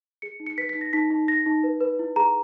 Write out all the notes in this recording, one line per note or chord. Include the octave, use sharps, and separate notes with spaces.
G#4 C#7
D#4
C#7
B4 B6
B6
D#4
A#6
D#4 B6
D#4
D#4 A#6
D#4
B4
B4
E4
G#4 A#5